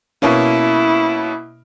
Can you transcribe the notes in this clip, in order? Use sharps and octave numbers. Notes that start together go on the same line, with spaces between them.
B2 A#3 C#4 E4